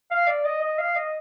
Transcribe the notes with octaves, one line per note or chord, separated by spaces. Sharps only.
F5
D5
D#5
D#5
F5
D#5